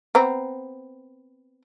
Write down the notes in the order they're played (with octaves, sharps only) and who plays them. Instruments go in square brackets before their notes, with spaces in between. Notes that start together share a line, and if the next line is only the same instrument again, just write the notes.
[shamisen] B3 C4 A#5